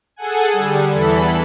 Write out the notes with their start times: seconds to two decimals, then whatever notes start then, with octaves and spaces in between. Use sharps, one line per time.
0.16 G#4 A4 F#5 G#5
0.53 D3 G3
0.93 E2 E3 A4 B5